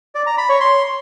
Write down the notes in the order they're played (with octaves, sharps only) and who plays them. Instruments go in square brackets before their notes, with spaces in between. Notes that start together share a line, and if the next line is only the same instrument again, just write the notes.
[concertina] D5
A#5
B5
C#5
C6